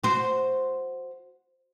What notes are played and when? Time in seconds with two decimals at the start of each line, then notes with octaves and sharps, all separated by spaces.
0.04 F#4 C5